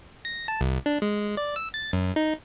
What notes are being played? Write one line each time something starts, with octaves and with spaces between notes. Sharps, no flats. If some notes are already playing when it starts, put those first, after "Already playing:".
A#6
A5
C2
D4
G#3
D5
E6
A6
F#2
D#4